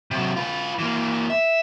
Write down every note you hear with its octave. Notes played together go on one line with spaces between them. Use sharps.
C3 F#3
F4 B4
E3 A#3
E5